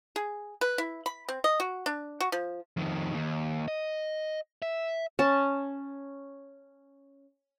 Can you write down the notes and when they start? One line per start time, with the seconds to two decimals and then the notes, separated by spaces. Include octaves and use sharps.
0.16 G#4
0.61 B4
0.78 E4
1.06 B5
1.29 C4
1.44 D#5
1.60 F#4
1.86 D4
2.20 F#4
2.32 F3
2.77 F2 D#3
3.14 D#2
3.68 D#5
4.62 E5
5.19 C#4 A5